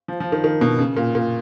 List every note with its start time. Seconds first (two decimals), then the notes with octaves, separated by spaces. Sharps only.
0.08 F3
0.20 F3
0.32 D#3
0.44 D#3
0.61 B2
0.79 C#3
0.97 A#2
1.15 A#2